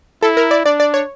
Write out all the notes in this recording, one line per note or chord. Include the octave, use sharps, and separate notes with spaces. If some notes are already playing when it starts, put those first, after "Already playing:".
E4 A4
A#4
D5
D4 D5
D5
C#5